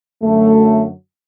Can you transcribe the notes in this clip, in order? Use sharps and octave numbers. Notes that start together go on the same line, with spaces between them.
F#2 D3 F#3 A3